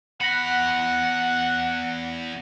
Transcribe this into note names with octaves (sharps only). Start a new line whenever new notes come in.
E2 F#5 B5 A#6 C#7